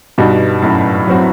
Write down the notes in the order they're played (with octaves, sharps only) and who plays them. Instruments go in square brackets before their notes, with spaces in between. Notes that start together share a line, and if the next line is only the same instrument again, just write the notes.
[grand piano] G2 [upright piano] B2 G3 D#4 F#4
[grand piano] F#2 A2
[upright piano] F#3 C4 F#4